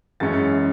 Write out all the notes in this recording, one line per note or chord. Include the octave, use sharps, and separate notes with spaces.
F#2 E3 G#3 C#4 A6